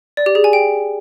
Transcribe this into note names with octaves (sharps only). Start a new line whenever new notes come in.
D5
G4
G#4
G#5
G5